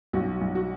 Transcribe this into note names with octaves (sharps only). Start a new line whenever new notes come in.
B1 F#4
B1
F#4